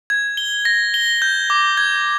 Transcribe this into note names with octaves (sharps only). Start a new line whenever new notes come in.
G#6
G7
A#6
G7
G6
D6
G#6